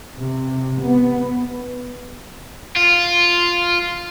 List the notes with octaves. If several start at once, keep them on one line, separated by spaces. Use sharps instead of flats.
C3
B3
F4